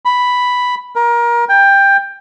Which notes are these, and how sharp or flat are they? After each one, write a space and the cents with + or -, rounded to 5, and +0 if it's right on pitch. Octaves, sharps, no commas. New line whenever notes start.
B5 +0
A#4 +25
G5 +15